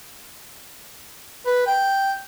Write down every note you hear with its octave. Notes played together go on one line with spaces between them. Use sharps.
B4
G5